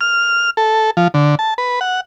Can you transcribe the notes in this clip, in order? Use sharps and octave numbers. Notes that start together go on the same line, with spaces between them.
F6
A4
F3
D3
A5
B4
F#5